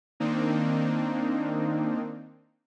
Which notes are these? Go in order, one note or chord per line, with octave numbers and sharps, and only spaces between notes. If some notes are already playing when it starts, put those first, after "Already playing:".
D#3 A#3 C4 D4 D#4